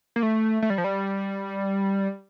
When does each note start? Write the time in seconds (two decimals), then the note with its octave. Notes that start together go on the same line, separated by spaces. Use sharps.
0.16 A#3
0.23 A3
0.62 A3
0.70 G3
0.78 F3
0.84 G3